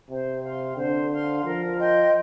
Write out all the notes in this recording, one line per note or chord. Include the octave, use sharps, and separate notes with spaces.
C3 C5
F5 C6
D3 C5
F5 C6
F3 A#4
D#5 G5 C6